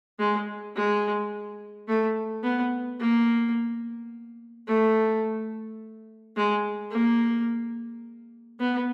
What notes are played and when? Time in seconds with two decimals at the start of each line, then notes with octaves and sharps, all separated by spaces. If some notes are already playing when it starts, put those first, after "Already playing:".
0.19 G#3
0.76 G#3
1.88 A3
2.44 B3
3.00 A#3
4.67 A3
6.36 G#3
6.92 A#3
8.60 B3